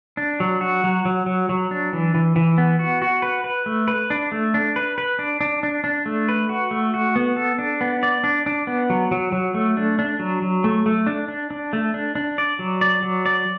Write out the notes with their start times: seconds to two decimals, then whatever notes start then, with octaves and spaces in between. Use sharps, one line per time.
0.17 D4
0.40 F#3
0.61 F#4
0.84 F#3
1.05 F#3
1.26 F#3
1.49 F#3
1.71 D4
1.93 E3
2.15 E3
2.36 E3
2.58 B3
2.79 F#4
3.02 F#4
3.22 B4
3.44 B4
3.66 A3
3.88 B4
4.10 D4
4.32 A3
4.54 D4
4.76 B4
4.98 B4
5.19 D4
5.41 D4
5.63 D4
5.84 D4
6.06 A3
6.29 B4
6.49 F#4
6.71 A3
6.94 F#4
7.16 B3
7.36 A4
7.59 D4
7.81 B3
8.03 D5
8.24 D4
8.46 D4
8.67 B3
8.90 F#3
9.11 F#3
9.32 F#3
9.54 A3
9.77 D4
9.99 D4
10.19 F#3
10.42 F#3
10.64 A3
10.86 A3
11.07 D4
11.28 D4
11.51 D4
11.73 A3
11.94 D4
12.15 D4
12.38 D5
12.59 F#3
12.81 D5
13.03 F#3
13.26 D5